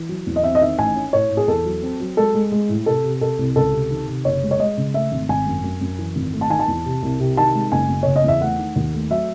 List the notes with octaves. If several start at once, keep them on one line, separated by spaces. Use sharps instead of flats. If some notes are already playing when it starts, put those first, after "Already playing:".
Already playing: E3
F#3
E2
D#5
C4 E5
D#5
D#3 E5
A1 G#5
C#4
A2 C#5
A2
G#4
E2 A4
F#3
C4
F#3
G#3 A4
G#3
G#3
A2
C3 A4
C3
C3 A4
C2
C#2 A4
C3
D#3
C3
F#1 C#5
G#3
C#5
G#3 D#5
C#3
A3 E5
G#1
G#1 G#5
F#2
F#2
F#2
E3
G#1
A3
A5
D#3 G#5
A5
E2
C3
C2
C3
D#3 A5
G#3
F#1 G#5
F#1
C#3 C#5
D#5
E2 E5
A3 F#5
D#3
D#2
A3
F#3 E5